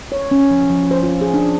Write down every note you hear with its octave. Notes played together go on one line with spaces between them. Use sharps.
C#5
C#4
F3
F3
C5
F4
G#4
D4